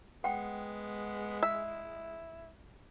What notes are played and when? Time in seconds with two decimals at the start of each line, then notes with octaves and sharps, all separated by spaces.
0.24 G#3 B3 F#5 G5
1.43 E4 E5